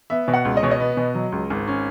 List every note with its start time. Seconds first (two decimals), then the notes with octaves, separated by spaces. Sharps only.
0.10 B3 E5
0.28 B2
0.34 F#5
0.45 C#2
0.57 D#5
0.63 B2 C#5
0.71 D#5
0.80 B3
0.97 B2
1.15 F#3
1.32 C#2
1.50 G#1
1.68 C#4